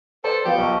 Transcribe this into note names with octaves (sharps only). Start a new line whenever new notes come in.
A4 B4 C5 D5
F3 B3 G4
B1 C#6